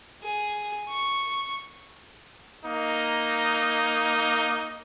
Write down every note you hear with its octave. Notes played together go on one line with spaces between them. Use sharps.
G#4
C#6
A#3 D#4